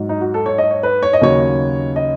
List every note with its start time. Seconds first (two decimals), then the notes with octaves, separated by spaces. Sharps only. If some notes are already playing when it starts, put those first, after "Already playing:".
Already playing: G#2 F#3
0.09 D#4
0.21 F#4
0.34 A4
0.46 C#5
0.58 D#5
0.71 C#5
0.83 B4
1.03 C#5
1.13 D#5
1.21 D#2 C#3 F#3 C#5
1.96 D#5